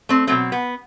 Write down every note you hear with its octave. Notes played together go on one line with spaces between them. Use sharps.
A3 C4
B2 F#3 A3 C4
B3